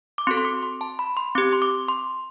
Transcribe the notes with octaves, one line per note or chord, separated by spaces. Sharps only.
D6
C4 F#4 A4 C6
C6
D6
C6
A5
B5
C6
C4 G4 D6
C6
D6
C6